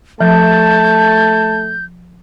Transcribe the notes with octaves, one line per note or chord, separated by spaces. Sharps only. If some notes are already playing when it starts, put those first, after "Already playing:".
F3 A3 A5 G6